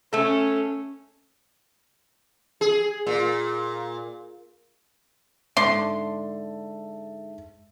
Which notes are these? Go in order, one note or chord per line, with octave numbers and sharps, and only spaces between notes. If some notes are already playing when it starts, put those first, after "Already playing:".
A3 C#4 A4
G#4
A#2
G#2 D3 E5 A5 C6